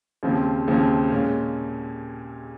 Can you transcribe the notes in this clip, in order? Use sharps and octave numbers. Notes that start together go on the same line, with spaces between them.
D#2 C#3 F3 C4
D#2 C#3 F3 C4
A#2 G#3 C#4